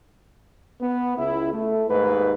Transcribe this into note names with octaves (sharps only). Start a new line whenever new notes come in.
B3
C#2 E4
A3
D#2 G#2 B4